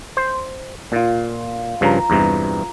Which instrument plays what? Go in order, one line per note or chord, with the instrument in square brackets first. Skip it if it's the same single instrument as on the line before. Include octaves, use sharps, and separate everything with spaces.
[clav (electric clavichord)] C5
[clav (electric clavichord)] A#2 [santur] F4 C5
[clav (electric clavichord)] G2 C#3 F3 [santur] C5 A#5
[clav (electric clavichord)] E2 G2 C3